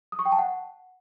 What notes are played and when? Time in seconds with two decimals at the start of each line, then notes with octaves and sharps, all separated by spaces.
0.12 D#6
0.19 C#6
0.25 G5
0.32 A5
0.39 F#5